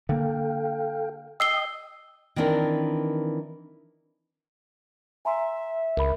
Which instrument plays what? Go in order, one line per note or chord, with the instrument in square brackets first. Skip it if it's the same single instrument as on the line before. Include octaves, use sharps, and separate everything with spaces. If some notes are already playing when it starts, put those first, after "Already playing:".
[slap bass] D3 A#3 [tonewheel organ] A4 F5 G5
[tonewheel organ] D#5 G5 D#6 [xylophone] E6 C7 G7
[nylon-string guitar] D#3 E3 C4 D4 A#4
[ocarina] E5 [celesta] G#5 A#5 C6
[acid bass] C#2 [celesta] A#4 B5